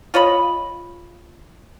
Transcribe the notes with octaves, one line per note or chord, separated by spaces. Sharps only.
F4 C#5 D#5 B5